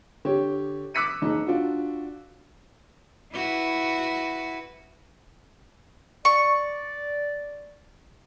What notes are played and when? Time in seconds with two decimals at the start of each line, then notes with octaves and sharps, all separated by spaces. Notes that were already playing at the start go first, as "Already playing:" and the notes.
0.25 D3 G4 C#5
0.94 D6 E6 F#6 B6 C#7 D#7
1.22 F#1 D#4
1.47 D4 F4 F#4
3.34 E4 F#4 B4
6.25 D5 C#6